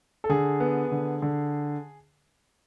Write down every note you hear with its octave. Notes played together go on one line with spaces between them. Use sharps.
A4
D3 G#4
B3
D3
D3